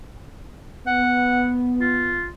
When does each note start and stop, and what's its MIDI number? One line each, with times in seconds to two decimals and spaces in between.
0.87 2.23 59
0.87 1.52 78
1.81 2.29 65